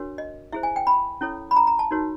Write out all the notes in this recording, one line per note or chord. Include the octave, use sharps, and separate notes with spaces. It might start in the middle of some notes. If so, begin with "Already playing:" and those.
Already playing: D4 F#4 A#4 C#5
D#5
E4 G#4 C5 E5
G#5
G5
B5
C#4 E4 A4 C#5
B5
A#5
A#5
A5
D#4 F#4 A#4 C#5